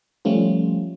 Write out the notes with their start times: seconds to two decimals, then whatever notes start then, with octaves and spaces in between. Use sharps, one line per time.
0.25 F3 G3 A3 C#4 F4